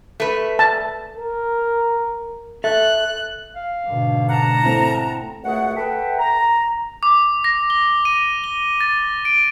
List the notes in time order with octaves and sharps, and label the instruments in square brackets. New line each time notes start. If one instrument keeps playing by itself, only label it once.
[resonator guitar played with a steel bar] A3 B4
[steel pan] A5
[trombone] A#4
[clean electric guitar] A4 E5 [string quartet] F#6
[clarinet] F5
[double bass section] G#2 B2 D3
[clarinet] F#5 [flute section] A5 A#5
[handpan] A3 C4 E4
[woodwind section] C#2 F#2 A3 G#4 F#5
A4 B4 E5 F#5 G5
A#5
[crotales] D6
A#6
G7
D#7
G7
A6
D7